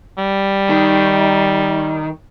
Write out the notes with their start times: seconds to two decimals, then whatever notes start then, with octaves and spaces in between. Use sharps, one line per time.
0.18 G3
0.70 D#3